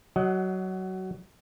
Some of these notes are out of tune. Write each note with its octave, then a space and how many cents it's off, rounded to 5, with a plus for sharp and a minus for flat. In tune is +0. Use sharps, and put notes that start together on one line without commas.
F#3 +20 D#5 +15 F#5 +0